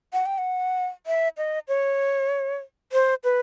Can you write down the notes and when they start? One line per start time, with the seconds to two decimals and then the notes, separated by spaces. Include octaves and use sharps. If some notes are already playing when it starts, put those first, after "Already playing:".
0.13 F#5
0.26 G5
0.38 F#5
1.07 E5
1.37 D#5
1.68 C#5
2.93 C5
3.24 B4